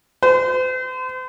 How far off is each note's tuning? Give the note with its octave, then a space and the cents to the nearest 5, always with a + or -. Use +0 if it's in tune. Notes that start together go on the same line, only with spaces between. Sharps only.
C5 -40